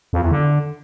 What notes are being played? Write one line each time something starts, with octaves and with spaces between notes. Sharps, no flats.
F2
E2
D3